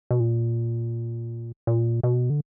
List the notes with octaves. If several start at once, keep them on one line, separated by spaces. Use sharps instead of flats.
B2
A#2
A#2
B2
D3